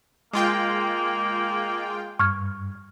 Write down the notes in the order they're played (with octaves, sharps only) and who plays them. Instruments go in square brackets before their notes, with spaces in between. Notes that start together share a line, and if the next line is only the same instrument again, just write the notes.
[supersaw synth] G#3 F4 G5 [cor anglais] A#3
[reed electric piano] G2 [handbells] C#6 F6 G#6